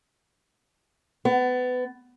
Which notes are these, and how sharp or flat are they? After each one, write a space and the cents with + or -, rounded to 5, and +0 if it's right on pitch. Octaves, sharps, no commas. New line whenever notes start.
B3 +25